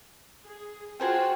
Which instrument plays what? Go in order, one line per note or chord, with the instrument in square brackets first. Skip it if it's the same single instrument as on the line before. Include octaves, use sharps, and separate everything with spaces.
[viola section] G#4
[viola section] F4 F#4 [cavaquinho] G#4 C5 G5